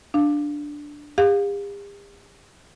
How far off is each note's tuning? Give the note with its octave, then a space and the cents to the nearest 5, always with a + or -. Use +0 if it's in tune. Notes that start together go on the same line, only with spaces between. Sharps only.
D4 +0 F5 +0
G4 +45 F5 +25